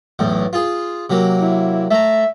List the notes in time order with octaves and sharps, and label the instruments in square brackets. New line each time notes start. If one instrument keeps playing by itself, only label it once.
[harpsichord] B1 E2 A2
F4 G#4
C3 F#3 A#3
[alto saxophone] E4
[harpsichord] A3 A#5 [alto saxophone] E5